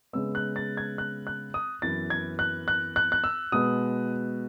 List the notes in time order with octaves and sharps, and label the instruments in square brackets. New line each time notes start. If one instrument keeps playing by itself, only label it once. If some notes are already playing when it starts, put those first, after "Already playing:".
[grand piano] C#3 G#3 B3 E6
F#6
A6
G#6
F#6
F#6
D#6
F#2 E3 B3 A6
G#6
F#6
F#6
F#6
F#6
E6
B2 G#3 B3 D#6